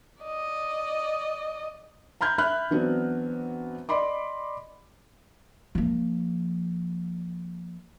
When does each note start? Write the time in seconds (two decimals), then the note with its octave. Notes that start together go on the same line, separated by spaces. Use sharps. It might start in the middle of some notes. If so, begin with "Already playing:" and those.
0.23 D5 D#5
2.21 A#5 B5 F6 G6 G#6
2.38 E5 B5 F6 F#6
2.71 E3 F#3 B3 C4 D4 F#4
3.89 D5 D#5 B5 C6 D6
5.75 F3 A#3